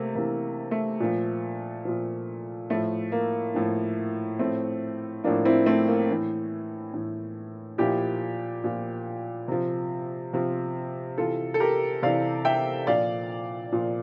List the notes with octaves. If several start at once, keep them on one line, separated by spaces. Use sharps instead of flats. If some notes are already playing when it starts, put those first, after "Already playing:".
Already playing: C3 A3 A#3
C3 E3 A#3
A3
A#2 F3
A#2 F3
A2 F3 A3
A#3
A2 F3
A2 F3 A3 C4
A2 F3 A#3 D4
C4 E4
A3 C4
A#3
A2 E3
A2 E3
A#2 F3 E4 G4
A#2 F3
C3 F3
C3 F3
C3 E3 F4 A4
A4
G4 A#4
C3 E3 D5 F5
E5 G5
A#2 F3 D5 F5
A#2 F3